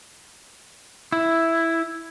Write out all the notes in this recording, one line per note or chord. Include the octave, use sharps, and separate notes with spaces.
E4